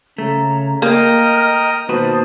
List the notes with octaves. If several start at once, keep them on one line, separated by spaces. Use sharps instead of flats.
C#3 A3 C#5 A#5
A#3 D#5 G5 A#5 D#6 F6
B2 D#3 A#3 F#4 B4 C5 A5 D#6